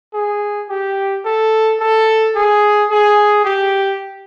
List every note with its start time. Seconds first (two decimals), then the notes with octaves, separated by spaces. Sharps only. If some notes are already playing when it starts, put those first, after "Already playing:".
0.14 G#4
0.69 G4
1.25 A4
1.80 A4
2.35 G#4
2.90 G#4
3.45 G4